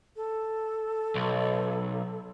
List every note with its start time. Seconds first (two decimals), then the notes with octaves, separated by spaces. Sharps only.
0.16 A4
1.15 B1